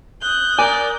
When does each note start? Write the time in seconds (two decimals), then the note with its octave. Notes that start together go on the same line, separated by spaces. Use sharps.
0.21 D#6 F#6 G6
0.59 A#4 D5 G#5